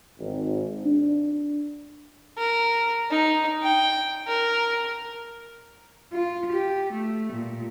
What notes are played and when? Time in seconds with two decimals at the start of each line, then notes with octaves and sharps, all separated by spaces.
0.19 G#1
0.84 D4
2.38 A#4
3.11 D#4
3.63 G5
4.27 A#4
6.13 F4
6.53 G4
6.93 A3
7.33 A#2